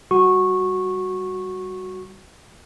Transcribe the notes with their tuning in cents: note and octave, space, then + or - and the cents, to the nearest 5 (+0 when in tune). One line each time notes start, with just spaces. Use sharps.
G3 +0 F#4 +0 C#6 -15